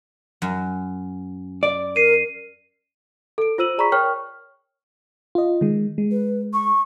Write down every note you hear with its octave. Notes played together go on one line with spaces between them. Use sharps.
F#2
D5
A#4 C7 D#7
A4 D7
F4 C5 E6 D#7 F#7
G#4 D5 A#5 B5 C#6 B6
A#4 C#5 G5 C#6 F6
F4 D#5
D#3 G#3
G#3
B4
C#6